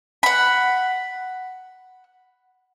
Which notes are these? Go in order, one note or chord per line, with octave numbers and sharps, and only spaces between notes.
F#5 B5